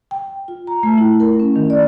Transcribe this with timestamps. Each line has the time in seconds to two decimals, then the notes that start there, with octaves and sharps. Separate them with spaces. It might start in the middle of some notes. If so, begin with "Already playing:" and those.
0.11 G5
0.48 F4
0.67 A#5
0.83 A3
0.98 E4
1.20 A#4
1.40 C#4
1.56 D#3
1.70 D5